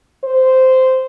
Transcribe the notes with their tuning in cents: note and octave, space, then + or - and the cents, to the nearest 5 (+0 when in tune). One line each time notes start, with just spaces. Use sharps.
C5 -10